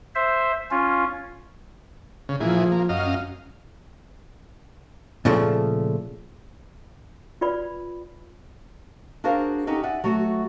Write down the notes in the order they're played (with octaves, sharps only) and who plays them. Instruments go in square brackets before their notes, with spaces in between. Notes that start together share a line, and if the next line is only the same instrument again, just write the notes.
[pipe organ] C5 E5
C#4 F4
[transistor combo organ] C#3
[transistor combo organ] A#2 E3 G#4 [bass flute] F3
[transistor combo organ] A#3
F#2 D#5 F5
[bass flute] C#4
[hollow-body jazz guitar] A#2 C#3 F3 A3
[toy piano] F4 B4 D5 B5
[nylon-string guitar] D4 F#4 G#4 A#4 C5 F5
C#4 D#4 F#4 G4 A4
D5 E5 F#5 G#5
F#3 A3 F#4